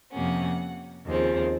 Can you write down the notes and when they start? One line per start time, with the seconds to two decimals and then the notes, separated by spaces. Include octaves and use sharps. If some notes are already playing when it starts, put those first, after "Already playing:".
0.12 F2 C3 F3 A#3 C#4 F#5
1.06 D#2 C#3 F3 C4